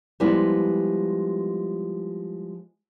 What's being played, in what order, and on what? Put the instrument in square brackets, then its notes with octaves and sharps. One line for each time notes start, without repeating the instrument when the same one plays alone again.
[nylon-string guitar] F3 G3 G#3 B3 E4